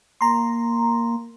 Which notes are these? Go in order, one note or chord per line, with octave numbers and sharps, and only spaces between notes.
A#3 A#5 C6